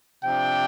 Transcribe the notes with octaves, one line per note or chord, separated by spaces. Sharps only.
C3 F3 D4 G5